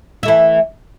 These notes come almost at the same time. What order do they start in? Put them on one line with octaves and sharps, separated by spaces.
E4 A3 E3